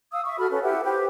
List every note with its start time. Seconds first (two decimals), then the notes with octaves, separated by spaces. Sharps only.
0.12 F5 D#6 E6
0.25 E5 C#6
0.39 F#4 A4 B5 F6
0.51 C#4 A4 B4
0.62 E4 G4 B4 F#5
0.84 G4 B4 C5 G5